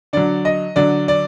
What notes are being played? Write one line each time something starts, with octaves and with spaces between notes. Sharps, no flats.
D3 F#3 D5
D#5
D3 F#3 D5
D5